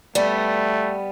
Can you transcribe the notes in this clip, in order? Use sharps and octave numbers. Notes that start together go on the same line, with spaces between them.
G3 A3 B3